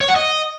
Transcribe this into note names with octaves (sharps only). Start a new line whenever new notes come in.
C#5
F#5
D#5